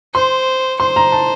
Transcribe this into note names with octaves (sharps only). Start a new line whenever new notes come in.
C5 C6
C5 C6
A#5
A5